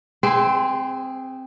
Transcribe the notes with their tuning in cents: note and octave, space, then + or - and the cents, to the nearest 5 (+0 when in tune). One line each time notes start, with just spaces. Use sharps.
C4 +0 G#4 -20 C5 -40